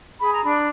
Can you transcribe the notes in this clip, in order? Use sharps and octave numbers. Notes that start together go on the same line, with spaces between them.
G#4 B5
A#5
D4 B5